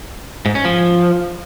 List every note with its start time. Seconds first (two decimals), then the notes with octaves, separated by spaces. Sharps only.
0.46 G#2
0.55 C#4
0.65 F3